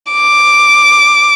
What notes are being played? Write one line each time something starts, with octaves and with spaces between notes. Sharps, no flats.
D6